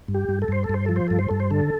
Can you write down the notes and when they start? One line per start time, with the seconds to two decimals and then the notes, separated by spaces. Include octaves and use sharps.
0.08 G2
0.14 G4
0.29 G2
0.42 A4
0.48 G2 C5
0.64 A4
0.69 G2 C5
0.86 F3 A4
0.96 C5
1.08 G2 A4
1.19 C5
1.29 G2 A4
1.40 C5
1.51 D3 A4